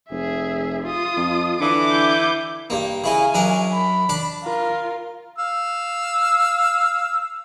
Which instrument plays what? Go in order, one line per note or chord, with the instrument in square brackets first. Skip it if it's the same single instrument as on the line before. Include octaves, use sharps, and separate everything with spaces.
[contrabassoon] F1 [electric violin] G#4 E5
[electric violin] F4 D#6
[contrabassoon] F2
[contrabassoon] D3 [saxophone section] E3 [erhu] D6
[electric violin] E4 G6
[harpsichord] G2 A#3
[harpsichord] C#3 E4 D#5 [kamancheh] F5 G#5
[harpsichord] F#2 D4 A#4
[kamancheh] B5
[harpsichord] D4 A5 D6
[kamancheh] F4 A#4
[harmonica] F5 E6